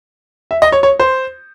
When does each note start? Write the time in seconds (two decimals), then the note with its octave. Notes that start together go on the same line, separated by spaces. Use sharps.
0.51 E5
0.62 D#5
0.72 C#5
0.83 C#5
1.00 C5